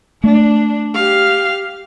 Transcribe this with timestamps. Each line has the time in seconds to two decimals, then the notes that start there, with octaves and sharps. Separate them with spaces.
0.24 A3 D4
0.95 G4 F5